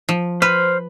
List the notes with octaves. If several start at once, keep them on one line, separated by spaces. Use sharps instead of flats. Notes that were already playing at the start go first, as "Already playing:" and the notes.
F3
B4 C5 F6